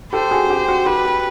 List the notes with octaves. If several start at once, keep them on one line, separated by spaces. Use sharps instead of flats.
G4 A4 C5
F#4 G#4
G4
F#4
G4 B4
G4